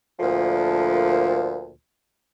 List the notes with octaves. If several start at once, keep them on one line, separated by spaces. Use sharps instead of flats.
D2 A#2 F3